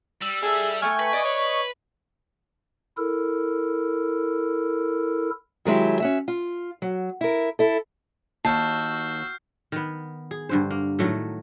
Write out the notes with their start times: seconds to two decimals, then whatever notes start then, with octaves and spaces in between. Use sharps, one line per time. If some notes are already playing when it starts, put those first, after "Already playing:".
0.22 G3 E6
0.42 E4 G#4 A4
0.82 A3 G5 G#5 C#6 F6
1.00 B4
1.13 D5 D#5
1.25 C#5
2.98 E4 A4 A#4
5.65 D#3 F#3 G#3 E4 G4
6.00 C#4 F#4 E5
6.28 F4
6.82 F#3
7.21 E4 A#4
7.59 E4 A4
8.45 D#2 F#4 A5 E6 F6 G6 C7
9.72 D#3 B3
10.31 G#4
10.49 G2 D3 C5
10.71 A#3
10.99 A2 D#3 F#3 A3